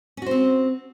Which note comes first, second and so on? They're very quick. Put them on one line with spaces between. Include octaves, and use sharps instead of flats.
C#4 F#4 C5 C4